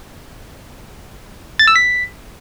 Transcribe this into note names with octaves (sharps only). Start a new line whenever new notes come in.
A6
E6
B6